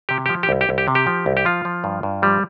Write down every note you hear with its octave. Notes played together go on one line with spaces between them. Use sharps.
C3 G4
F3 G4
G4
C2
G4
C2
G4
C3
G4
F3
C2
G4
F3 F4
F3
G2
G2
F3 G3